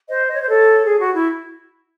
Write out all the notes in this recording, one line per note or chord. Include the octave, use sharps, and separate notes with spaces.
C5 D#5
D#5
C#5
C5
A4 C#5
G#4
F#4
E4